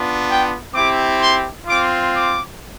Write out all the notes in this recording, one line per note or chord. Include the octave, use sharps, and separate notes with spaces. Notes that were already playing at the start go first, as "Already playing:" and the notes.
Already playing: B3 D4 F4
G5
C4 E4 G4 D6
C6
C4 F4 D6
D6